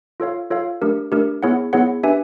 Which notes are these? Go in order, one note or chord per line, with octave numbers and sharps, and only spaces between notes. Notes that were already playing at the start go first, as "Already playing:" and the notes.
F4 A4 C#5 F5
F4 A4 C#5 F5
A3 D4 G4 A#4
A3 D4 G4 A#4
B3 E4 G#4 C#5 F#5
B3 E4 G#4 C#5 F#5
D4 G4 B4 E5 G#5